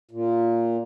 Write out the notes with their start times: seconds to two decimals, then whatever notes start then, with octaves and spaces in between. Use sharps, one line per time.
0.11 A#2